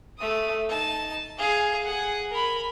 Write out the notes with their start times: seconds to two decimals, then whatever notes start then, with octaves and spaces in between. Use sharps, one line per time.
0.18 A3 D#6
0.69 D#4 A5
1.38 G#4 F5
1.84 G#4 F#5
2.31 A#4 B5